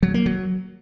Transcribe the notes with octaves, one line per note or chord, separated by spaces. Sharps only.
F#3
A#3
F#3